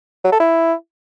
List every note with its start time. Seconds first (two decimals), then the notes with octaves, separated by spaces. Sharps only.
0.24 F#3
0.32 A4
0.40 E4